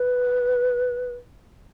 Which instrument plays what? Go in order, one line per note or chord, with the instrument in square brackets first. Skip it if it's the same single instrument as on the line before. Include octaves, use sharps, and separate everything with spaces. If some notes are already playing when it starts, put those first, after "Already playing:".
Already playing: [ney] B4